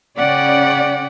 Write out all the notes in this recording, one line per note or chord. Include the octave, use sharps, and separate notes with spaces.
C#3 C#4 D5 F#5 G5